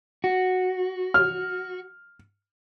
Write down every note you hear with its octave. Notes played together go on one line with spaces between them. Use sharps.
F#4
F6